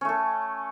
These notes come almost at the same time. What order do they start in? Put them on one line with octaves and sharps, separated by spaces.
C#4 A3 A4